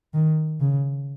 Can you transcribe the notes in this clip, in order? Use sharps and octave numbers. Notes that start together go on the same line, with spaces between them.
D#3
C#3